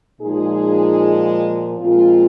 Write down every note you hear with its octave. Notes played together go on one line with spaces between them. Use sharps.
A#2 F3 G#3 D#4 G#4
A#2 F3 G#3 C4 F4